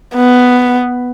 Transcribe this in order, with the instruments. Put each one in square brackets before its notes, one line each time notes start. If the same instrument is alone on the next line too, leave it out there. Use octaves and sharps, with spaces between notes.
[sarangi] B3